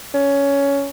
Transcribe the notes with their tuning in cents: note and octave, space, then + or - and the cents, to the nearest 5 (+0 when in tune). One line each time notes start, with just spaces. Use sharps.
C#4 +15